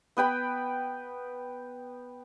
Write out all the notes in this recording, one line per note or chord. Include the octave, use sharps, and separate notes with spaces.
B3 B4 G5 B5